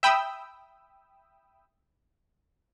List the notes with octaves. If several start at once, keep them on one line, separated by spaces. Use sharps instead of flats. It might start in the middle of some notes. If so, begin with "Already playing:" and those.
E5 G5 B5 D#6 E6